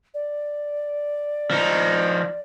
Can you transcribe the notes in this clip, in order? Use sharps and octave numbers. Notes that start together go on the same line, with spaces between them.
D5
F3 D#4